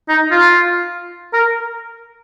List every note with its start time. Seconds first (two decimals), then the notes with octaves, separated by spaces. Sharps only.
0.09 D#4
0.31 F4
1.33 A#4